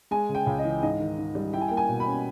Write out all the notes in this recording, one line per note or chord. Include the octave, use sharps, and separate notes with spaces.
G#3 G#5
C#3
G5
C#2
D#5
E3
G#2 D#5
D#3
G#2
G3
E4 G5
G#5
G5
A#3
G#5
B2
B5
C#4